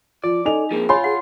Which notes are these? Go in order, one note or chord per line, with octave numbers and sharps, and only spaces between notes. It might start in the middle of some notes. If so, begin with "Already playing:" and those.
F3 F4 D5
D#4 A4 G#5 F7
F3 A#3 C4 G#4
F4 C#5 G#5 B5 C6
G#4 F#5